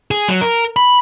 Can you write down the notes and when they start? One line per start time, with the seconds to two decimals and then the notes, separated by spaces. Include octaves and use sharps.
0.11 G#4
0.29 F#3
0.41 A#4
0.76 B5